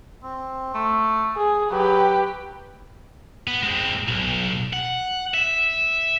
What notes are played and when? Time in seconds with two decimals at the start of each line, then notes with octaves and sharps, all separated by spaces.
0.23 C4
0.74 A3
1.36 G#4
1.71 F#3 G4 B4
3.47 B3
3.63 G#3 C4
4.08 B1
4.73 F#5
5.34 E5